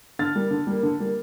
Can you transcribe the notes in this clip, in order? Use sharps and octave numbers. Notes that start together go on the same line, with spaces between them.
D3 F6 A6
G3 A#3
D3
G3 A#3
D3
G3 A#3